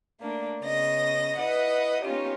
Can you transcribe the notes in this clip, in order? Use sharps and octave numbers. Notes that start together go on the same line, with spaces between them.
A3 A#3 D4
C#3 B3 D#5 A#6
E4 B4 D#5 F#5
B3 C#4 D#4 F4 G4